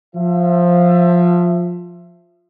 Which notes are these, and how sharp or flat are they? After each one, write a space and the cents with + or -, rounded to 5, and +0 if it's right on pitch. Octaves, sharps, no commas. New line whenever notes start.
F3 +10 E5 +25